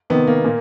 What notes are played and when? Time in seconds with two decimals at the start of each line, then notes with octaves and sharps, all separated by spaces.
0.10 C3 D#3 B3
0.27 A#3
0.44 A#2